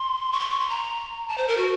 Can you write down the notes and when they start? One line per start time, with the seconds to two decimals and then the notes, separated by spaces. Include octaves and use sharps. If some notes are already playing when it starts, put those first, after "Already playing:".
Already playing: C6
0.33 C#6
0.40 C6
0.50 C#6
0.60 C6
0.70 A#5
1.28 A5
1.38 C5
1.48 A#4
1.57 F#4